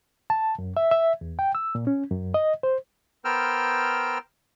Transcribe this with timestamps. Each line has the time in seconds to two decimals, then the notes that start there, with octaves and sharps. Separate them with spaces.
0.30 A5
0.59 F#2
0.77 E5
0.91 E5
1.21 E2
1.39 G5
1.55 E6
1.75 A#2
1.87 C#4
2.12 F#2
2.34 D#5
2.63 C5
3.25 B3 A#4 C5 G5 E6 F6